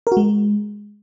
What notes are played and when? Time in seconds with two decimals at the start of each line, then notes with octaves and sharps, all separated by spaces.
0.07 A#4
0.12 F#4
0.17 G#3